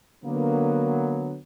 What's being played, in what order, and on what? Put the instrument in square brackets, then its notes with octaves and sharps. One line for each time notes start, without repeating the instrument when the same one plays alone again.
[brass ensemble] D3 F#3 B3 [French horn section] A#3